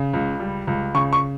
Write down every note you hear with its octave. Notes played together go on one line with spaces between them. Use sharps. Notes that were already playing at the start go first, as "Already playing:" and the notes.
Already playing: C#3
C#2
G3
C#2
C#3 C#6
C#6